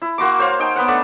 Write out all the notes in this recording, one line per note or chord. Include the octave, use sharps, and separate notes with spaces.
E4
A#3 F#4 C6 D6
C5 C#5 F5
D#4 G5 G#5
B3 B4 F#5
A3 D4